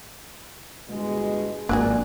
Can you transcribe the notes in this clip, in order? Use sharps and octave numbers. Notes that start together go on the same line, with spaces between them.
G1 B2 G#3
G#1 F2 G#2 A#3 D4 F#4 G#4 D5